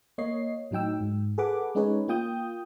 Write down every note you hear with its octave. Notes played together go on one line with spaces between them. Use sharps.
A#3 C#5 D#5 C7
A2 F#3 D#4 G5 E6
G#2
G#4 A4 B4 F#5 B5 D6
G#3 C#4 D#4 G#4 B4 C#5
A#3 F4 G5 D#6 G6